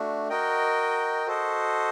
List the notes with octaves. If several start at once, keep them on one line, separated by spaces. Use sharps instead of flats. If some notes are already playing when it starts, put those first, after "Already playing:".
Already playing: A3 D4 F#4
F#4 A#4 D#5 G5
F#4 A4 C5 D#5